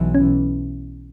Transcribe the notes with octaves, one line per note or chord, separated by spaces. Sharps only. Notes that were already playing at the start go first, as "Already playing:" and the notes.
Already playing: B1 E3
C#4